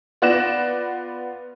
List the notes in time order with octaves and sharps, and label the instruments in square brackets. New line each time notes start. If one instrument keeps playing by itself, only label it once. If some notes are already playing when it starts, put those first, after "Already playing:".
[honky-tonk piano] B3 F4 D5 F#6 A#6 E7